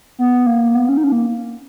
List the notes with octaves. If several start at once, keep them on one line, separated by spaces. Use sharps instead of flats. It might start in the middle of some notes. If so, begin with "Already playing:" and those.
B3
A#3
B3
C#4
D#4
C#4
A#3